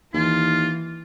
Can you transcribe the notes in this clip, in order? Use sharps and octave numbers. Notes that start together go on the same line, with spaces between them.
D#2 E3 F4